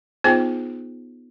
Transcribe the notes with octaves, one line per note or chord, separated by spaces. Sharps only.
B3 D#4 F4 G#4 C5 G5